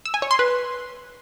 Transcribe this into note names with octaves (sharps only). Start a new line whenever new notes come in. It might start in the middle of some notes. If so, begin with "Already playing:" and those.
E6
G#5
C#5
C6
B4